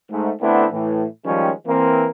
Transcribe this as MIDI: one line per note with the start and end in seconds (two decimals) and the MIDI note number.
0.11 0.31 44
0.11 0.31 57
0.41 0.66 50
0.41 0.66 57
0.41 0.66 59
0.41 0.66 60
0.41 0.66 62
0.41 0.66 64
0.72 1.05 45
0.72 1.05 52
1.25 1.51 51
1.25 1.51 53
1.25 1.51 55
1.25 1.51 56
1.25 1.51 61
1.66 2.08 52
1.66 2.08 58
1.66 2.08 60